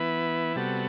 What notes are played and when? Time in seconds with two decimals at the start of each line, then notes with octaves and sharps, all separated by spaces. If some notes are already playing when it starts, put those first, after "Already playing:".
Already playing: E3 B3 E4 B4
0.56 C3 G3 B3 F#4 A4